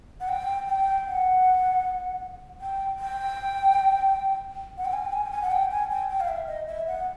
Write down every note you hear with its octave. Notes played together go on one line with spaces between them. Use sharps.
F#5
G5
G5
F#5
G5
G5
F#5
G5
G#5
G5
G#5
G5
G#5
F#5
G5
G#5
G5
G5
F5
E5
D#5
E5
F#5